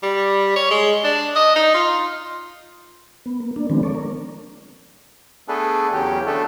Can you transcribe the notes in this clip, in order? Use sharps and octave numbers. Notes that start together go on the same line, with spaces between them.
G3
C#5
G#3
D4
D#5
D#4
F4
B3
A#3
A#3 D4
D#3 F3 G#3 B3 C4 D4
A4 C#5 D5
A#4
A3 B3 D4 G#4 A4 B4
E2 C#3 F#3 G4
D3 A3 B3 D4 A4 B4